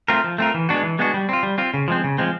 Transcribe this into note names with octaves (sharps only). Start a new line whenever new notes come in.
A3 C4 F4 A#4
F3
A3 C4 F4 A#4
E3
G#3 B3 D4 F#4
E3
G#3 B3 D4 F#4
G3
C4 F4
G3
C4 F4
C#3
F3 G#3 C4
C#3
F3 G#3 C4